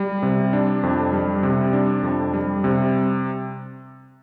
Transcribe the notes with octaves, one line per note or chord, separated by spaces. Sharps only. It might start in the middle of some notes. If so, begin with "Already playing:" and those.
Already playing: G3
C3
D4
F2
G3
C3
D4
F2
G3
C3